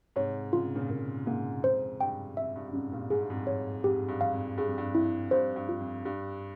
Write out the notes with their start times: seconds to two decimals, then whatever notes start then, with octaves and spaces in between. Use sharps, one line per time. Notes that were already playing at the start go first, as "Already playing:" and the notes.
0.16 G#2 C3 C#5
0.53 C#3 F4
0.64 C3
0.75 A#2 C#3
0.90 A#2 C#3 A#4
1.26 G#2 C3 A#3
1.63 F2 G#2 C5
2.00 G2 G5
2.37 F2 E5
2.56 G2
2.68 G2
2.73 F2 G#2 C#4
2.92 G2 A#2
3.10 G#2 G#4
3.21 G2
3.30 F2 G#2
3.47 C#5
3.84 F2 G#2 G4
4.08 G2
4.21 F5
4.33 F2
4.58 G2 G#4
4.68 F2
4.78 G2
4.95 F2 E4
5.31 G2 C5
5.56 G2
5.69 F4
5.80 F2
6.05 G2 G4